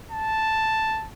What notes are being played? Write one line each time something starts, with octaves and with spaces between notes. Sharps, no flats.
A5